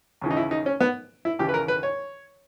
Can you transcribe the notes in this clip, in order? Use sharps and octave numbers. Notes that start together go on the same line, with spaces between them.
D#2 C#3 E3
D#4
E4
D#4
C#4
B3
E4
D#2 C#3 E3 G4
B4
A#4
B4
C#5